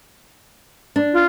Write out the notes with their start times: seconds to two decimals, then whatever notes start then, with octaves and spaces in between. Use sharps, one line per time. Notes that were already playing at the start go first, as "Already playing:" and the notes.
0.96 D4
1.13 F4